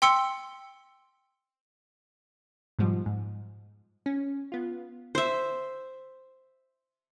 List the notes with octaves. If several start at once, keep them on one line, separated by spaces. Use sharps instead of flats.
G5 C6 E6 C#7 G7
G#2 B2 F3 G3
G#2
C#4
B3 F4
C5 E5